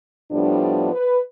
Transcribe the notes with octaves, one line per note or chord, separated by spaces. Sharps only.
A2 F3 G3 B3 D4
B4